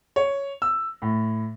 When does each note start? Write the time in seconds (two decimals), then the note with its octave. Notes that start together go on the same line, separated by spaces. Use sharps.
0.16 C#5
0.62 E6
1.02 A2